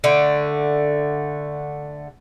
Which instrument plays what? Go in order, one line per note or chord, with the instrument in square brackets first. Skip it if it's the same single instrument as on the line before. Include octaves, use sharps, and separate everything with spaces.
[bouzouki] D3 A3